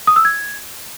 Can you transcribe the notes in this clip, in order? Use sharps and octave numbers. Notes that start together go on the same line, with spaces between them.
D#6
E6
G#6